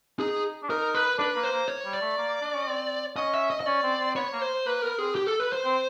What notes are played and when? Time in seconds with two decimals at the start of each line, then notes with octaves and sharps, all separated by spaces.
0.20 D#4 G#4
0.63 D4
0.69 D#4 A#4
0.95 B4
1.18 D4 B4
1.36 A#3
1.44 C5
1.52 A#3
1.68 C#5
1.85 G3
1.93 D5
2.02 A3
2.18 A#3
2.41 D4
2.54 C#4
2.68 C4
3.16 C#4 D#5
3.34 E5
3.50 D#5
3.61 D#5
3.66 C#4 D5
3.83 C4
4.00 C4
4.16 B3 C#5
4.33 A#3
4.41 C5
4.66 A#3 B4
4.82 B3 A#4
4.99 C4 G#4
5.15 G4
5.27 A4
5.40 B4
5.53 C5
5.65 C4